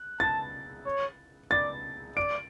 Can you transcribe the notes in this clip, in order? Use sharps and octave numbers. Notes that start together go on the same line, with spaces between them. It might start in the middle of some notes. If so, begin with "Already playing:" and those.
Already playing: F#6
A5 A6
C#5
D5 A6
D5 D7